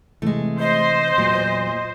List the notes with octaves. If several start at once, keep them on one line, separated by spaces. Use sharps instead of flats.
C3 E3 G#3 A3
C5 D#5
E2 A#2 F#3